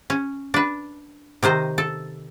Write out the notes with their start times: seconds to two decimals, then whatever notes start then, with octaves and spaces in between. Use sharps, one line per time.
0.10 C#4
0.54 D4 B4
1.43 C3 D#3 C5 D#5
1.78 A4